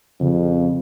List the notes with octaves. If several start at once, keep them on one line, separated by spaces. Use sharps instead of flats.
F2 C#3